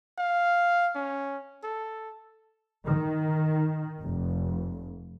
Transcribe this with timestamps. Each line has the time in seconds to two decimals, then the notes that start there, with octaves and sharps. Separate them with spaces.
0.18 F5
0.95 C#4
1.64 A4
2.86 D#3
4.02 F1